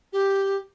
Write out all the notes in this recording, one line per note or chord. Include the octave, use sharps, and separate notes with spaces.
G4